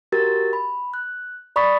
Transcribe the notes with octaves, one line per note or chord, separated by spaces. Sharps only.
F#4 G4 A#4 A6
B5
F#6
D5 B5 C#6 D#6 A6 B6